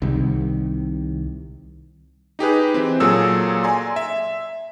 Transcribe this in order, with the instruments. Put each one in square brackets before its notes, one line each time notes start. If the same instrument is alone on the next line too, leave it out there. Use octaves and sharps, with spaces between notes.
[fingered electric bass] C2 C3 D#3 G3
[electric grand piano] D#4 G4 G#4 B4
E3 C4
A#2 F#3 G#4 A4 E6
D5 G#5 A#5 C6
E5